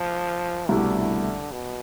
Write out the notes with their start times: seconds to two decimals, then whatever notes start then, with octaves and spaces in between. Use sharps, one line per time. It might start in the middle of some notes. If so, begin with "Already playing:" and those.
Already playing: F3
0.69 C2 B2 D3 A3 E4 G4
1.52 B2